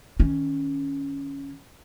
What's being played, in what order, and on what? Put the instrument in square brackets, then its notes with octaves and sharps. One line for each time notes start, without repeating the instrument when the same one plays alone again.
[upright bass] D#3 C#4